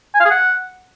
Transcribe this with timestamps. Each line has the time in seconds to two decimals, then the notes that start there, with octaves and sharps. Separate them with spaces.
0.15 G#5
0.20 F5
0.25 G#4
0.31 F#5